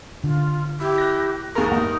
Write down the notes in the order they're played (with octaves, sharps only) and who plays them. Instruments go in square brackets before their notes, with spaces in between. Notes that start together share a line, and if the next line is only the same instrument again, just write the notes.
[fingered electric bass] D3 [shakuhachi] F4
[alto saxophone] E4 [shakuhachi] G4
[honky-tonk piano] F#6 A#6
[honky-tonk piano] D#2 A#5 [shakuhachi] G#4 [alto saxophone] A#4
[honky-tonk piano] G2 F#5 [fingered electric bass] A#3 [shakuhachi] D#4